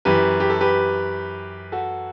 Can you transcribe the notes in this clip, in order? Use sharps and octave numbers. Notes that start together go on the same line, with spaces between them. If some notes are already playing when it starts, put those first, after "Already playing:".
F#2 E3 G4 B4
G4
A4
G4 B4
F#4 A4